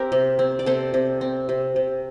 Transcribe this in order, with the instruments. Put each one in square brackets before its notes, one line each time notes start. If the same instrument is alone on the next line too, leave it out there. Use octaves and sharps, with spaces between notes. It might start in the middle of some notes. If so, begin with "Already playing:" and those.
Already playing: [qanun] C4 G4 A#4
C3
C4
D5
C3 A4 C5
C3
C4
C3
C3